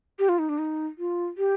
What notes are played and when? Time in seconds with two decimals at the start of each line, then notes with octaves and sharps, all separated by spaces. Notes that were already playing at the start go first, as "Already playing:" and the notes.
0.19 G4
0.29 F4
0.39 D#4
0.49 D4
0.59 D#4
0.98 F4
1.38 G4